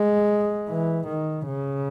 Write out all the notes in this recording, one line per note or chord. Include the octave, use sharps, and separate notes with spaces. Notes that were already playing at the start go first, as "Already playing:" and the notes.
Already playing: G#3
E3
D#3
C#3